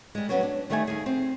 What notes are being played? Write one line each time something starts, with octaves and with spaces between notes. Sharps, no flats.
G3 G#3
F#3 B3 C#4
D4
D#3 G3 A3 E5 F5 G#5
D#2 G#4
C4